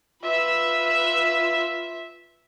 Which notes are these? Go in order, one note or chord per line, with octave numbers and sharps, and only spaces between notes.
F4 B4 E5 E6